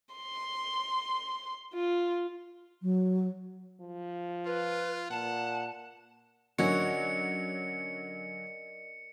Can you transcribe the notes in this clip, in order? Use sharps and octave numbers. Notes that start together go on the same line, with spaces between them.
C6
F4
F#3
F3
F4 B4
A#2 F#5 A5
D3 F#3 C#4 F#4 A#4 D5 D#5 C#7